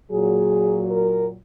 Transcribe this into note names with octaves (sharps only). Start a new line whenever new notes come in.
A#2 F#3 G#4
A#4